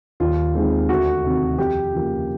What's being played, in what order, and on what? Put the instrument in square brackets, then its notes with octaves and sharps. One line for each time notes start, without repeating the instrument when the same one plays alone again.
[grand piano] D#2 F4
D#3 G#3 C4
D2 F#4
C3 D#3
F2 G4
C#3 F3 A#3